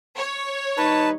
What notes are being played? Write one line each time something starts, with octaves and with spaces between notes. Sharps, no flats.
C#5
D#2 G3 D#4 B4 A5